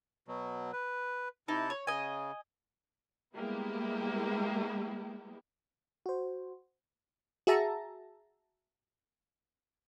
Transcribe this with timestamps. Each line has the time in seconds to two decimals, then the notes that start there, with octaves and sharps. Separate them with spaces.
0.28 B2 F#3
0.73 B4
1.48 C3 D#4 E4 A5
1.70 C#5
1.87 C#3 D#5 G#5
3.36 G3 G#3 A#3 B3 E4 G4
6.06 F#4 C5
7.47 F#4 G#4 E5 A5 A#5